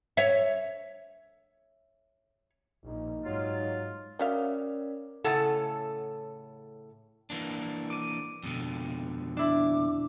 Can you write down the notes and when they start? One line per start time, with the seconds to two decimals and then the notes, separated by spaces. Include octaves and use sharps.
0.17 C#5 E5
2.86 A#1 D#4
3.24 G#2 F#3 F4
4.19 F#3 C#4 A#4 D5 E5 F5
5.24 A2 C#3 A4 F#5 A5
7.30 E3 A#3 D4
7.90 D6 D7 D#7
8.43 F2 B2 D3
9.37 D4 E4 D6